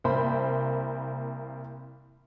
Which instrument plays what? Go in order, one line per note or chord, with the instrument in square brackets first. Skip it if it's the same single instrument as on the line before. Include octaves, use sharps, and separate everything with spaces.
[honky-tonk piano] C2 A#3 C5 B5